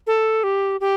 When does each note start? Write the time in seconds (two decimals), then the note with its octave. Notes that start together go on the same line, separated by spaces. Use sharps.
0.07 A4
0.44 G4
0.81 G4